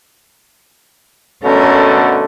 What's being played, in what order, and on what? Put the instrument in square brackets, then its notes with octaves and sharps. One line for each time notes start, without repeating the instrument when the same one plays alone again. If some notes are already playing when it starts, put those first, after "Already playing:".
[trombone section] B2 D3 A3 [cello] C#4 A#4